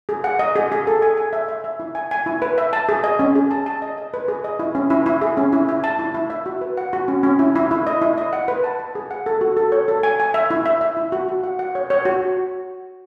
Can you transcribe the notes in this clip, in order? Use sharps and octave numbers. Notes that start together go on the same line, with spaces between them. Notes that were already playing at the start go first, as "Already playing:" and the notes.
G#4
F#5
D#5
G#4
G#4
A4
G#5
G#5
E5
E5
E5
E4
G#5
G#5
E4
B4
E5
A5
G#4
D#5
C#4
G#4
A5
A5
D#5
D#5
B4
G#4
D#5
E4
C#4
E4
E4
G#4
C#4
E4
E4
A5
E4
E4
E5
F#4
B4
F#5
F#4
C#4
C#4
E4
E4
E4
D#5
E4
D#5
F#5
B4
A5
A5
G#4
F#5
A4
F#4
A4
C#5
A4
G#5
G#5
E5
E4
E5
E5
E4
F#4
F#4
F#5
F#5
C#5
C#5
F#4